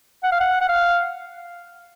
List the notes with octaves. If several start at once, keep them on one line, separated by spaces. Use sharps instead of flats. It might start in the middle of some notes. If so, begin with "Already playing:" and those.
F#5
F5
F#5
F#5
F5